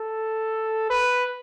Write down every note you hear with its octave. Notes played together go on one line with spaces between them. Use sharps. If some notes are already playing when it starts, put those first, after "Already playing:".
Already playing: A4
B4